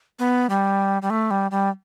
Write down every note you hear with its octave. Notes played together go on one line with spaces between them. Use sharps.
B3
G3
G3
A3
G3
G3